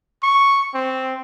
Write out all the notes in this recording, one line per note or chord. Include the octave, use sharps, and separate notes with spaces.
C#6
C4